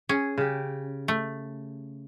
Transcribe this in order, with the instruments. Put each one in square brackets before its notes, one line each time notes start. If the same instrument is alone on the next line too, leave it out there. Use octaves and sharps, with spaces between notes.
[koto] C#4 [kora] G#4
[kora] C#3 G4
[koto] A3